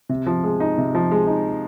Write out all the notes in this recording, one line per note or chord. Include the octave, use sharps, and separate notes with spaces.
C3
F3
G#3
D#4
C3
F3
G#3
D#4